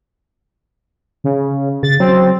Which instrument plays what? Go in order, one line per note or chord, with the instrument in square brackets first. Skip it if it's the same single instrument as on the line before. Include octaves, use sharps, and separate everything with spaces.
[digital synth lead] C#3
[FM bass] C#3 [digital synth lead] A6
[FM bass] F#3 [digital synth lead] C4